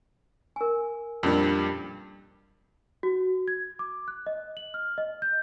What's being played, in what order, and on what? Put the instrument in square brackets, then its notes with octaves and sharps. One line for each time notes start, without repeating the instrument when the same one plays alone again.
[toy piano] A#4 G#5
[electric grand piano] F2 A#2 G3 [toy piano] C#4 D4 A#4
[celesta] F#4
G#6
D6
F#6
D#5
F#7
F6
D#5
G6